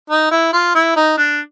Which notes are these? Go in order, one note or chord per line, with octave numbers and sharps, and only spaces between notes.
D#4
E4
F4
E4
D#4
D4